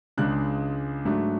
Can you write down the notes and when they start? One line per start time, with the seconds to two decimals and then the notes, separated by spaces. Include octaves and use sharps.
0.17 C#2 C#3 G#3 D4 F#6
1.05 G#2 F#3 A3 D4